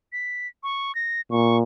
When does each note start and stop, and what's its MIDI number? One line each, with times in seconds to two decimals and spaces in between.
0.13 0.48 95
0.63 0.94 85
0.95 1.21 94
1.31 1.62 46
1.31 1.57 85